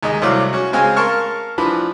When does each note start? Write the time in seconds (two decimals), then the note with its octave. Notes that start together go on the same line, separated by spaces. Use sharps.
0.03 D#2 G#3 D#4 D#5
0.22 C2 A2 F#3 A3 D5 F5
0.53 C#4 F#4
0.73 C#3 G#3 C4 F5 G#5 F6
0.96 A#4 F5 A5 C6 C#6 F6
1.58 E3 F3 D4 B4